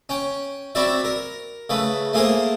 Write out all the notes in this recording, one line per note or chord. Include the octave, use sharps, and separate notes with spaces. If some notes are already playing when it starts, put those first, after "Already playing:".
C#4 G5
C4 E4 F#4 D5 E5
A#4
C#3 A3 B4
A3 A#3 G#4 A#4 C5